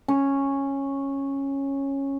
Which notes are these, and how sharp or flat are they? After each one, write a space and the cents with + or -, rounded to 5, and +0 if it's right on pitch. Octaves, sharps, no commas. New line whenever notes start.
C#4 -10